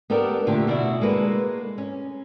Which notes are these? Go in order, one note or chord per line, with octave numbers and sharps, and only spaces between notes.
B3 D4 G4 A4 A#4
A#2 D3 A3 G4
B2 D4 E4 F#4
G#3 A#3 A4 B4
C#4